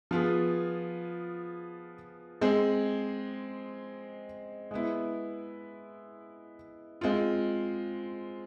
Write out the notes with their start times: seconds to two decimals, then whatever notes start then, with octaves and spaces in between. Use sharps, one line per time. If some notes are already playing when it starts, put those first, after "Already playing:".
0.11 F3 B3 F4 G#4
2.41 G#3 C4 G#4
4.71 G#3 B3 E4
7.01 G#3 C4 F4